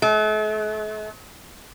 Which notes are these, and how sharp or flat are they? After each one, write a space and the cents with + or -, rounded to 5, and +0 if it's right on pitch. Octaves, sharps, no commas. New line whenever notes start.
A3 -45